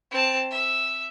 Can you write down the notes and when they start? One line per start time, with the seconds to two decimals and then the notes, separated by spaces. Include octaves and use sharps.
0.11 C4 A5
0.51 E5